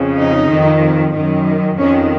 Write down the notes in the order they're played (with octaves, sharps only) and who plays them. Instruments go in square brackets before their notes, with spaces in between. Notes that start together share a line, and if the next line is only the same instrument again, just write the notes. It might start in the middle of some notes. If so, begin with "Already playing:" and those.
Already playing: [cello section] F2 C#3
D#4
F2 D#3
F#2 D#3
F2 D#3 C#4